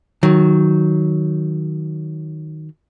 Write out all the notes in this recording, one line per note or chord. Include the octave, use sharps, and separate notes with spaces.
D#3 F#3